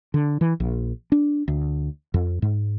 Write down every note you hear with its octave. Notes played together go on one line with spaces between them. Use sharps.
D3
E3
A#1
D4
D2
F2
G#2